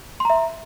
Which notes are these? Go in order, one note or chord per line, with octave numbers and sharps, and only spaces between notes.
E5 A#5 C6